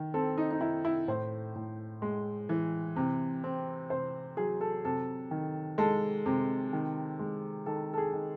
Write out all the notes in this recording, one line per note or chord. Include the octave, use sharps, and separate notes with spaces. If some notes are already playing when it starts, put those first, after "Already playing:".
Already playing: D#3
C4 A4
D#4
D#4
D#3 E4
E4
A2 C5
A2
G#3
E3
C3
C4
C3 C5
F#3 G#4
A4
C3 A4
D#3
G#3 A4
C3
D#3
G#3
D#3 A4
A4
G#4
D#3